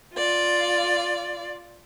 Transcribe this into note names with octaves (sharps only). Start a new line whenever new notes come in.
F4 D5